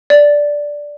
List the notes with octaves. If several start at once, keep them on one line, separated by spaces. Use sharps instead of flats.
D5